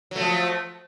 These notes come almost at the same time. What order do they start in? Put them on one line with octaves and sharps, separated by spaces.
F#3 A3 F3